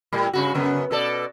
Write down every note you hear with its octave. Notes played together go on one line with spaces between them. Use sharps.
A2 G3
G2 C#3 F#4
F#2 C#3 B3
B2 A4 D5